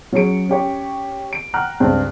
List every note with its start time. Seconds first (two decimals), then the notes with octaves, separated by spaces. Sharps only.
0.12 F#3 C#4 G#4 C#7 D7
0.49 C#4 G4 C#5
1.33 D7
1.54 F#5 G5 A#5 F6 F#6
1.80 C#2 G2 C4